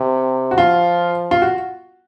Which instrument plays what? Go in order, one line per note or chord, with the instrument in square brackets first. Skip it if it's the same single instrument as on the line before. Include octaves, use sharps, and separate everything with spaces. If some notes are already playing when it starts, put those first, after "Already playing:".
Already playing: [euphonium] C3
[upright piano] F#4
[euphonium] F3 [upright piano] F4
[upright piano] F4
F#4